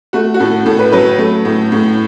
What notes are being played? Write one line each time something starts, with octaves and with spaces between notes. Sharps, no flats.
A3 F#4
F#4
A2 A4
A2 A4
B4
F#3 B4
A3
A2
A2